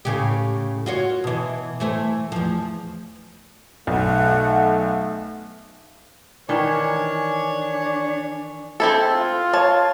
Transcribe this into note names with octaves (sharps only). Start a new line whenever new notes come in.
A2 C#3 G4
F4 F#4 C#5
B2 E3
E3 A3 C5
E2 F3
B1 A3 F#5
D#3 E3 D4 C#5 G#5
C4 E4 A4
F4
C#5 A5